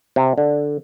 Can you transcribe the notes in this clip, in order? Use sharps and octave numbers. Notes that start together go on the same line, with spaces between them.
C3
D3